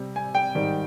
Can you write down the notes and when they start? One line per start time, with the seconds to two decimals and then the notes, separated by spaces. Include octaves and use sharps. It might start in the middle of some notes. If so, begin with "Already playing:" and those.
Already playing: C3 G3
0.16 G#5
0.35 G5
0.55 G#2 D#3 G3